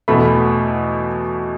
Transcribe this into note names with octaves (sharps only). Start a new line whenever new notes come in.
E2 B2 A3 B5